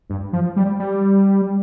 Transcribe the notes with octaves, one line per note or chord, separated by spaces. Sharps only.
G2
F3
G3
G3